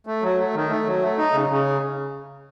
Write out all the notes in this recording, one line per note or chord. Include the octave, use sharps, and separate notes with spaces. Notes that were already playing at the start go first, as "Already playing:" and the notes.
A3
F#3
A3
D#3
A3
F#3
A3
D#4
C#3
C#3